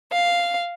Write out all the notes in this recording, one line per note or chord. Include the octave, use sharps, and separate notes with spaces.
F5